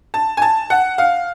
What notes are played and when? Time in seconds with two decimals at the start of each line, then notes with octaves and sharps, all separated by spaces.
0.14 A5
0.37 G#5
0.42 A5
0.70 F#5
0.98 F5